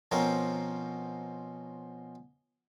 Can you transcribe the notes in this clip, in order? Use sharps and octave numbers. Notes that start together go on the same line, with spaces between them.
B2 F3 C4 C#4 A#4